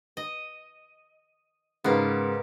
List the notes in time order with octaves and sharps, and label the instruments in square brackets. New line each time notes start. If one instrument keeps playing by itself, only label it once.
[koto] D#5
[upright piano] G#2 C#3 [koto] A#3 B3